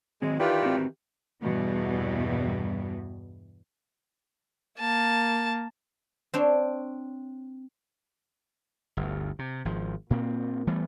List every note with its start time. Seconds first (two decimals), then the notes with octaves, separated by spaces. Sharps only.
0.22 D#3 F#3 G#3 C4
0.40 D#3 E3 F4 G4 B4 D5 G5
0.62 C4 D#4 F#4
1.42 E2 G2 B2 E3 G3
4.80 A#3 A5
6.34 C4 D4 C#5
8.97 G1 D2
9.39 C3
9.65 G#1 F3
10.10 A#2 A#3 C4
10.67 E3 G3 A3 B3